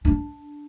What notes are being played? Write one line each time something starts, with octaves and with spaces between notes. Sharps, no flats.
D4